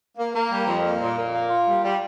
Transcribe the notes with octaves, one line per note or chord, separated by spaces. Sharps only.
A#3
A#3
G3
F2
A#3
A#2
A#2
A#3
F4
G3
G3